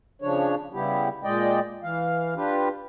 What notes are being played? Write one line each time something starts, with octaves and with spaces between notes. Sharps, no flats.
C#3 F3 D4 C#5
C#3 G3 B3 E4 G4
A#2 G#3 D5 D#5 G5
E3 F5
D4 F4 G4 B4